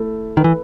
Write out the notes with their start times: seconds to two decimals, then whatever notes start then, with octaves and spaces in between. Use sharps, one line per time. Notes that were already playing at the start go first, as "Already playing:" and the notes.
Already playing: A3 E4
0.37 D#3 B4
0.44 E3